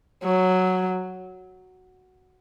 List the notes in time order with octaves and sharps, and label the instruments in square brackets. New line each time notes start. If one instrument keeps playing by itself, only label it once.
[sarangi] F#3